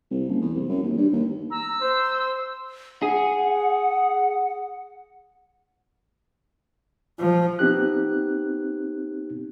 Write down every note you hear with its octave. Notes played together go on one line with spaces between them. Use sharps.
C2
F#1
E2
C2
F#2
D#2
G2
D#2
A#5 E6
C5
G#4 F#5
F3
B3 C4 D#4 G4 F#6